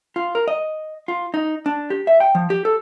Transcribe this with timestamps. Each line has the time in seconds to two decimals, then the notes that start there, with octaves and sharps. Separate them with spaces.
0.16 F4
0.35 A#4
0.48 D#5
1.08 F4
1.34 D#4
1.66 D4
1.90 G4
2.07 E5
2.20 G5
2.35 F3
2.50 G4
2.65 A4